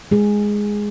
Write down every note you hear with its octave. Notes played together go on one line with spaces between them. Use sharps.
G#3 G#4